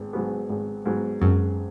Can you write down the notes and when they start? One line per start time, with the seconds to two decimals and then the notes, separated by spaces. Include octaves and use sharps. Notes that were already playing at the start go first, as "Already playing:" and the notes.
Already playing: G#1 B3
0.13 G#2 F#3 B3
0.49 G#1
0.86 G#2 F#3 B3
1.21 G#1 F#2